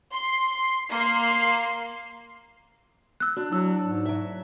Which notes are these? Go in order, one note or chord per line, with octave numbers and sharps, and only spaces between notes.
C6
A#3 C6 C7
E6 F#6
D4 F#4
F#3 E4 E6
G#2
F#3 E5